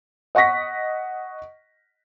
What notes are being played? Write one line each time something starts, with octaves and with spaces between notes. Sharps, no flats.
D#5 F#5 C#6 A#6 B6